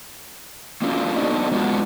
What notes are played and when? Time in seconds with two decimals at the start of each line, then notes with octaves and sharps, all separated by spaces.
0.82 A#3 C#4 D4 F4 F#4
1.16 B3 D4 D#4 F#4 D#5
1.52 G#3 B3 D4 F4 F#4